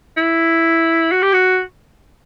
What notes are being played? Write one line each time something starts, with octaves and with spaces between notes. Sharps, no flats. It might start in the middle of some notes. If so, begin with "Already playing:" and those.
E4
F#4
G4
F#4